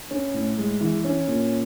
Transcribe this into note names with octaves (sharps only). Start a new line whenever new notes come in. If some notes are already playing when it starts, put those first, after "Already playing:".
C#4
A2
G#3
E3
C#4
A#2